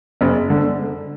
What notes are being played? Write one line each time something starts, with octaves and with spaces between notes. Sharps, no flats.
F#1
D3